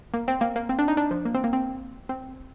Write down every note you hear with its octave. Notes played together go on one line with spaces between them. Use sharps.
A#3
C4
A#3
A#3
C4
D4
D#4
D4
F3
A#3
C4
A#3
C4
C4